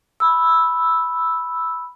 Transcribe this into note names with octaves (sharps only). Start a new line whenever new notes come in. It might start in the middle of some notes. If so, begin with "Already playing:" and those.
B5 E6